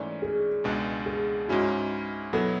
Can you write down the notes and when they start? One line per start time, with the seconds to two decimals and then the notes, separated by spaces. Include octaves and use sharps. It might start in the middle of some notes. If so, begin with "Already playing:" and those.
Already playing: G#2 E3 A3 C#4 D5
0.22 G#4
0.64 C#2 B2 G#3 D4
1.06 G#4
1.48 G#2 G#3 C#4 E4 F#4
2.33 B2 F#3 B3 E4 A4